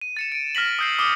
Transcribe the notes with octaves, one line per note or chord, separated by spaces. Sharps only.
D#7
A6 C#7 E7
D7 D#7
F6 A#6 B6 F#7
D#6 E6 G6 A#6 C7
D6 D#6 C#7 E7 G7